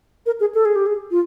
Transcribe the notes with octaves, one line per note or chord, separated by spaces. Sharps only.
A#4
G#4
A4
G#4
G4
G#4
F4